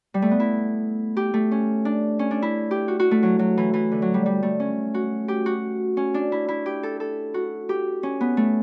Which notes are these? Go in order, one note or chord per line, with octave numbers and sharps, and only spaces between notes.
G3
A3
B3
E4
G4
A3
C#4
D4
C#4
D4
E4
G4
F#4
F#4
A3
F#3
F#3
E3
E3
D3
F#3
G3
G3
A3
C#4
F#4
G4
F#4
C#4
D4
E4
E4
G4
A4
A4
F#4
G4
C#4
B3
A3